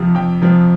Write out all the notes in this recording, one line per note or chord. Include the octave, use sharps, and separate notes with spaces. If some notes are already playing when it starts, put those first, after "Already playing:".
Already playing: F2 C3 F3
F2 G5
C3 F3